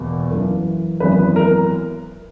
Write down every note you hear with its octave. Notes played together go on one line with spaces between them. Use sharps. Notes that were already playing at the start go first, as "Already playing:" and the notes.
Already playing: E2 B2 A#3
F#2 E3 A#3
G#1 F#2 E3 B3 B4
A#4